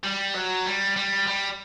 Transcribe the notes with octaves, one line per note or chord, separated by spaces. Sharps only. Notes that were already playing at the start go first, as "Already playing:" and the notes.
G3
F#3
G3
G3
G3